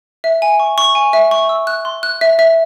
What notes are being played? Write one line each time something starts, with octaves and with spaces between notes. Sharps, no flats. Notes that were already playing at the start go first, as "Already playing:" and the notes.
E5
G#5
C#6
C#6
G#5
E5
C#6
E6
F#6
C6
F#6
E5
E5